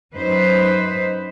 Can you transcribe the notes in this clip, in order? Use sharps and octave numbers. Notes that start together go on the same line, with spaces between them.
F#2 D#4 B4 C5